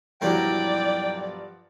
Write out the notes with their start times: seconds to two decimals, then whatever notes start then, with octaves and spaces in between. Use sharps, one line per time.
0.21 B1 G2 F3 F#3 E4 A#4 D5 G5